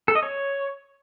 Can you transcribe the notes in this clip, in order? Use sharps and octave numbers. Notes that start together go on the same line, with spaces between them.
A4
D#5
C#5